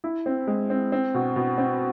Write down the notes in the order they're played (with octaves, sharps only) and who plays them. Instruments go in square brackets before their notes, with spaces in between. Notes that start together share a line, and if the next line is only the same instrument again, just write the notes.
[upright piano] E4
C4
G#3
C4
C4
B2
B2
C4